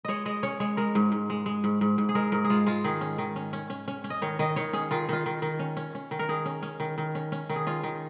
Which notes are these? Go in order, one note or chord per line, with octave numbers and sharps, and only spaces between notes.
G#3 C#5 D#5
G#3 D#5
C#4 C#5
G#3 C#5
G#3 A#4
G#2
G#2
G#3
G#3
G#2
G#2
G#2
G#4
G#3 A#4
G#2 A#4
G#4
G#3 F4
G#3 F4
D#3 G#4
C#4
D#3
C#4
C#4
C#4
C#4
C#4
D#5
D#3 C#5
D#3 D#5
D#3 C#5
C#4 G#4
D#3 F4
D#3 F4
D#3
D#3
C#4
C#4
C#4
D#3
A#4
D#3 G#4
C#4
C#4
D#3
D#3
C#4
C#4
D#3
G#4
C#4 F4
D#3